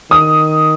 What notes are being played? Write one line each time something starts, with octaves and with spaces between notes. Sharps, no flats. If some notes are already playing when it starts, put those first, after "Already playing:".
D#3 D#6